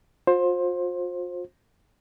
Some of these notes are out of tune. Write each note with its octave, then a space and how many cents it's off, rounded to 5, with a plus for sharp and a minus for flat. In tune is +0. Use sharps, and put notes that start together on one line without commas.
F4 +40 C5 +20